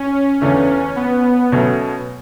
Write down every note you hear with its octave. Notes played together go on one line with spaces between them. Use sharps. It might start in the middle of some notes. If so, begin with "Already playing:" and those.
Already playing: C#4
E2 C#3 E3 A3 C#4 D4
B3
B2 F#3 A3 C#4